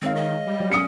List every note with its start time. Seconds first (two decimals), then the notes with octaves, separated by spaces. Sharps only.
0.02 D#3 G#3 C4 C#5 F5
0.16 D#5
0.47 G3
0.60 F#3 D5
0.72 C#4 D#6 C#7